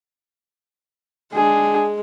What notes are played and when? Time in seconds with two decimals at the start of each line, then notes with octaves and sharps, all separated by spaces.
1.33 G#3 D4 G#4